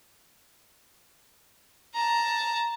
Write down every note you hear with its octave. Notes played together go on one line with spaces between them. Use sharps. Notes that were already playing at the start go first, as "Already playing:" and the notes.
A5 A#5